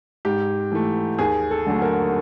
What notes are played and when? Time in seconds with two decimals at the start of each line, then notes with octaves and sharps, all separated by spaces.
0.25 G#2 G4
0.72 E3 A3
1.19 D#2 G#4
1.51 A4
1.67 D3 F#3 A3
1.82 A#4